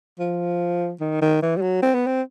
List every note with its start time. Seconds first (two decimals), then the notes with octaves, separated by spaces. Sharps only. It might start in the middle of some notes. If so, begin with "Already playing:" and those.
0.19 F3
1.01 D#3
1.22 D#3
1.42 E3
1.56 G3
1.62 F#3
1.82 C4
1.94 B3
2.07 C4